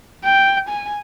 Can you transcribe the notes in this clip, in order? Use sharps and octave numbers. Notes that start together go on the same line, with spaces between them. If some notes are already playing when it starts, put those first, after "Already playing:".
G5
G#5